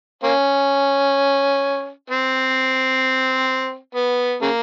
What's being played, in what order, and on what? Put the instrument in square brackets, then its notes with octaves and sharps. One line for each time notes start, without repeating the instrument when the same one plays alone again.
[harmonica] A#3 C#4
C4
B3
C#3 A#3